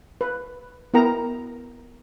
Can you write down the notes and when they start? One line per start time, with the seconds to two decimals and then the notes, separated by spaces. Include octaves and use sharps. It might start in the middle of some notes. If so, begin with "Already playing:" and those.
0.21 B4
0.94 B3 E4 A#4 G5 A#5